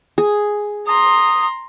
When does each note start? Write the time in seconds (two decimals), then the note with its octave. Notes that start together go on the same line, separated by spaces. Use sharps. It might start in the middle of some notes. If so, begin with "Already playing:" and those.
0.18 G#4
0.87 A#5 C6 D#6